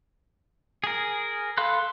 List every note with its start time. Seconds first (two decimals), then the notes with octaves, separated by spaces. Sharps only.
0.84 G#4 A#4
1.58 A4 F5 B5 C6 F#6